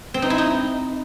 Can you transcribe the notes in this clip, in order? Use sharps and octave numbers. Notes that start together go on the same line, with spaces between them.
C4
D#4
E4
D#4